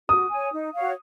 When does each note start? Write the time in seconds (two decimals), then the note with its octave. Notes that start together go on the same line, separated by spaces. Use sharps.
0.08 F#4 D#6
0.30 C#5 G#5
0.52 D#4
0.74 F#4 C#5 F5